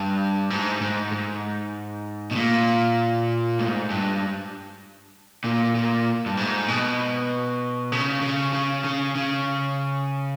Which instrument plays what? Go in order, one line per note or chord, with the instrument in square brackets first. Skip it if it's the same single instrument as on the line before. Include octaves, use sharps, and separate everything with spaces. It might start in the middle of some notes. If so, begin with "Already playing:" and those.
Already playing: [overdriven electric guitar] G2
G#2
G#2
G#2
B2
A#2
G#2
G2
A#2
A#2
G2
G#2
B2
C#3
C#3
C#3
C#3
C#3